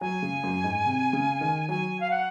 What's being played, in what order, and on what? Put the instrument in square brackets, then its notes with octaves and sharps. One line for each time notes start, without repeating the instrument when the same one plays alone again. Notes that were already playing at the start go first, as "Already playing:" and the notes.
[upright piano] F#3 [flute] G#5
[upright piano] C#3
F#2
G#2
C3
C#3
D#3
[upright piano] F#3 [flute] G#5
[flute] F5
F#5